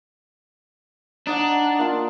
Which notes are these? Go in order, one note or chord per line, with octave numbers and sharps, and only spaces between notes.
D4 D#4 F#5
A#3 F4